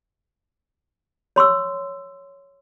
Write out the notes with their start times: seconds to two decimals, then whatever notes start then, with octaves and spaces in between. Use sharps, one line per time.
1.36 C#5 C6 C#6 E6